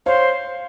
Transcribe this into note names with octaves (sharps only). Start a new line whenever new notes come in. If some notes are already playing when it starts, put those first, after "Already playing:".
C5 C#5 F5